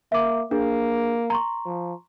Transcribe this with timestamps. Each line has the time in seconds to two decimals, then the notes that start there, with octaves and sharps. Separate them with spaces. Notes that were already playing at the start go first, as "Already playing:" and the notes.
0.12 A#3 E5 D6
0.51 A#3 D4 G#4
1.30 A#5 C6 C#6
1.66 F3